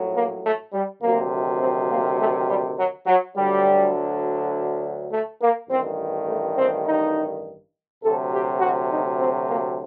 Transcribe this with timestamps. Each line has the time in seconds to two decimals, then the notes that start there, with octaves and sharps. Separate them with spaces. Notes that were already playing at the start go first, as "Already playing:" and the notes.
Already playing: A#1 A2 F#3
0.15 A#3
0.44 A3
0.73 G3
1.01 D2 C3 D#3 F#3 A#3
1.61 C4
1.90 A#3
2.19 A3
2.48 G3
2.78 F#3
3.06 F#3
3.36 D2 D3 F#3 G3
5.11 A3
5.40 A#3
5.69 A1 G2 D#3 C4
6.28 A3
6.57 C4
6.86 D#4
8.03 D2 C3 F#3 A4
8.32 G4
8.61 F#4
8.91 D#4
9.19 C4
9.48 A#3